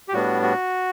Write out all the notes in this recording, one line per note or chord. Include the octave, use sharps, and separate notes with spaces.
G4
A2 G3 B3 D4 F#4
F#4